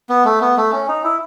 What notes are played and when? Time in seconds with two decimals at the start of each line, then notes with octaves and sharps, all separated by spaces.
0.09 B3
0.25 A3
0.41 B3
0.57 A3
0.73 C#4
0.88 D#4
1.04 E4